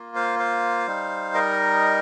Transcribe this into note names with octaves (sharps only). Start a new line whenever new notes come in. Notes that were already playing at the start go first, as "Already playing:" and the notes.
Already playing: A#3 F4
C5 F5
C5 F5
G3 D#4
A#4 D#5